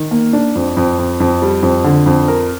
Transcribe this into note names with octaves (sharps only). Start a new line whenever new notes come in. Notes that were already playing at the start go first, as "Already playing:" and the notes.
Already playing: D#3
A#3
D4
F2
F2
F2
F2
G3
F2
D3
F2
A#4